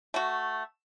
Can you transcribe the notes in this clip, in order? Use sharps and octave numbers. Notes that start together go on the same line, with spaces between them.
A3 F#4